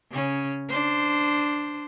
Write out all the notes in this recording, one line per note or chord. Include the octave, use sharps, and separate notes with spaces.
C#3 C#4
D4 C5